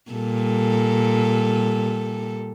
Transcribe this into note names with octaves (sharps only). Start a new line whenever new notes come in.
A#2 G3 A4